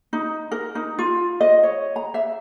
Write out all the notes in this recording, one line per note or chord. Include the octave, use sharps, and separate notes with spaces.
D#4
A#4
D#4
F4
D#5
C#5
A#5
E5